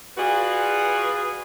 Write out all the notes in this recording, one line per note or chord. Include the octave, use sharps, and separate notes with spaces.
F4 F#4 G#4 B4 D5